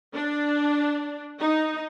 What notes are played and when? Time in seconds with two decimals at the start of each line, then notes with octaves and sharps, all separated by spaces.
0.14 D4
1.39 D#4